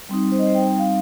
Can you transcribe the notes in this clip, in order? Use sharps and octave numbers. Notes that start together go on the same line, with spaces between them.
G3 C4 D#4
C5
D#5
C5
G5
F5